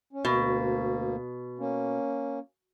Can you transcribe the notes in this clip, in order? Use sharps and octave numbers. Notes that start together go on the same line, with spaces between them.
C#4
D2 B2 A#3
A#3 C#4